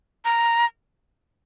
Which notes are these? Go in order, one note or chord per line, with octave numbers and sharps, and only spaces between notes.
A#5